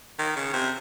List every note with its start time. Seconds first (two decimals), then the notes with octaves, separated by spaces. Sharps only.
0.19 D#3
0.36 C#3
0.53 C3